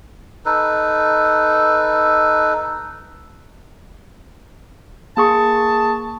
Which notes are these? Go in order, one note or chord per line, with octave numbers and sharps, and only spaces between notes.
D#4 A4 B4
A#3 G#4 A5 C#6